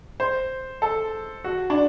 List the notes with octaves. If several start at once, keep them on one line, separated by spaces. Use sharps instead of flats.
C5
A4
F#4
D4